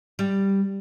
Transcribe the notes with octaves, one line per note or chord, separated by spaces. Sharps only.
G3